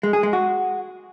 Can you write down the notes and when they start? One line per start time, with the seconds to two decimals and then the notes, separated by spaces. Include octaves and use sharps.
0.03 G#3
0.13 G#4
0.23 G#3
0.33 F#4